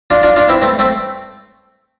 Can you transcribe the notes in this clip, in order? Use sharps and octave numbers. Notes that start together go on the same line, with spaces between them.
D4 F4
D4 F4
D4 F4
C4 E4
A3 C4
A3 C4